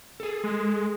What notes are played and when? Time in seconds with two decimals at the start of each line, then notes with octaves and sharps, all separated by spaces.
0.20 G#4 A4
0.44 G#3